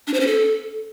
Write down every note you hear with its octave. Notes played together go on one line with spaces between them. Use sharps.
D4
C5
C#4
A4